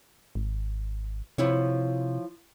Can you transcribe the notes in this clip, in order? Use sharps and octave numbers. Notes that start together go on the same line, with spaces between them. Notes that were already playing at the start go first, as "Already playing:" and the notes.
G#1
C3 F3 E4 C#5